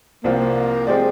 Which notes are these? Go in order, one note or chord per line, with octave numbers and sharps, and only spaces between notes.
C2 C3 F3 A#3 C4 F4
F3 G#3 C4 G4 D5